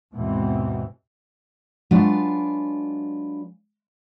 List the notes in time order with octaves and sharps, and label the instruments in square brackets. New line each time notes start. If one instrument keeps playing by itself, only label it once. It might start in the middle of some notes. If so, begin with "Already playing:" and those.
[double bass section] D#2 G#2 B2 E3 G#3 C4
[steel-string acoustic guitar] F#3 G#3 D4 F4 B4 F5